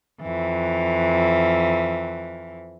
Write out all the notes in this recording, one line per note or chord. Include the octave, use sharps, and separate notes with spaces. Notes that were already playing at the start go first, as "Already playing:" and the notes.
F2 E3